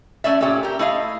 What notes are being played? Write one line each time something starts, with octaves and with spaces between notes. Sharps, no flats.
A3 C#4 D5 E5
A#2 G#3 C#4 G4 A4 E5
G4 A#4
A3 E4 D#5 F5